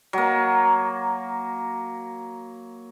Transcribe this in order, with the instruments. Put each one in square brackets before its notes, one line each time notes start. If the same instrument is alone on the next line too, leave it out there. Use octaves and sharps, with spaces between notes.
[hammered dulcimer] F#3 A#3